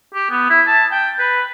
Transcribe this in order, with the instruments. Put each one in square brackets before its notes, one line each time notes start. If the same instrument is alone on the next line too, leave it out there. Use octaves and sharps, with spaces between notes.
[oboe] G4
B3
E4
A5
G5
B4